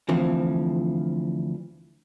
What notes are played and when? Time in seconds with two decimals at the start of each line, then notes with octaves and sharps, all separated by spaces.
0.09 D2 E3 F3 C4